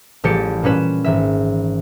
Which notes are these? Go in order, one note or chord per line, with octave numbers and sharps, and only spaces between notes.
A1 F3 G3 G4 A5 C#7
A#2 G3 C#4 B4 E7
G#1 E3 E5